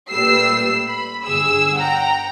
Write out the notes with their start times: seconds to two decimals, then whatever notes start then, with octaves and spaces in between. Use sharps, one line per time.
0.11 A#2 G3 A3 B4 E6 C7
0.88 B5
1.24 G1 G#4 E6
1.77 F#5 G5 A#5